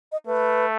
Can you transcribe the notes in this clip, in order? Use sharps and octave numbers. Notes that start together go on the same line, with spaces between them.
D#5
A3 B4